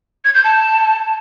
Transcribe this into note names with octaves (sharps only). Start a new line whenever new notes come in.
G#6
G6
A5